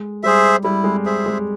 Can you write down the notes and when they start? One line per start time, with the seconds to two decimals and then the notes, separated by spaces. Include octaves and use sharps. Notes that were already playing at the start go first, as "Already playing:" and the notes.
Already playing: G#3
0.23 G3 G#4 C5 E5
0.64 G3 E4
0.84 G#3
1.05 G#4 C5 E5
1.26 G#3